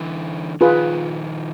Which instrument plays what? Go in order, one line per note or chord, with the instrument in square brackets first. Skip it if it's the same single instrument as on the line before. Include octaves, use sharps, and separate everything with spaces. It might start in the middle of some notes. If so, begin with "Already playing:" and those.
Already playing: [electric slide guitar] D3 E3
[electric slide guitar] D#3 F3 [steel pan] F4 G#4 B4